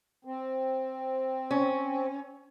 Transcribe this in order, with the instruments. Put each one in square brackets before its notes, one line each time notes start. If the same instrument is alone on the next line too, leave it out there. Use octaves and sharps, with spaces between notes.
[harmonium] C4
[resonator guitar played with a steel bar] C#4